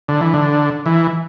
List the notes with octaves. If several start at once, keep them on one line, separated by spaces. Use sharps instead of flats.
D3
E3
D3
E3